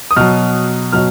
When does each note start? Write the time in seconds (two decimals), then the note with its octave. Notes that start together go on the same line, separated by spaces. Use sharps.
0.11 D#6
0.16 B2 F#3 F6
0.92 B2 F#3 F6